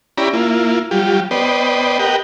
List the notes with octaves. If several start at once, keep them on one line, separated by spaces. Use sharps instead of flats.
C#4 E4 G4 D5 A#5 B5
A#3 E4 F4
F#3 G3 F4 G4
B3 B4 C5 D5 D#5 G5
G4 A#4 B4 D#5 F#5 G5